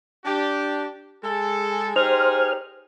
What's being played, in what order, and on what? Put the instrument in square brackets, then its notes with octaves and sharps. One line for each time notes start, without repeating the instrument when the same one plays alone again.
[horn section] D4 G4
G#3 G#4 A4
[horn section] D#4 G4 G#4 [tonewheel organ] C5 F6